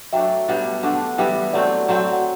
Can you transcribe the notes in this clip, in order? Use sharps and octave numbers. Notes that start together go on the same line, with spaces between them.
F#3 A3 D4 E5 G5
B2 G3 B3 D4
D3 A3 D4 F#5 A5
E3 G3 B3 E4 E5 G5
F#3 A3 C4 D5 F#5
F#3 A3 C4
F#5